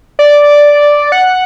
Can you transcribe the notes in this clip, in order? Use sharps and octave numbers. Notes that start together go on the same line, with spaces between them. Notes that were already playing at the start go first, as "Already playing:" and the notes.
D5
F#5